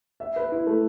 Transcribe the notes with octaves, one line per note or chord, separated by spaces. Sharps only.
E5
B4
E4
A3